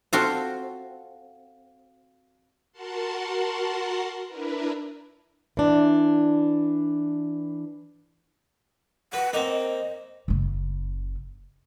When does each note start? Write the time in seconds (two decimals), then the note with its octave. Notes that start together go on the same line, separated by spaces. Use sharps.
0.13 C4 F4 F#4 A4 C5
2.72 F#4 A#4 F#5 A5 C6
4.27 D4 E4 A#4 B4
5.57 E3 D4
9.13 B4 F#5
9.33 A#3 C4 D#5
10.28 F#1 C#3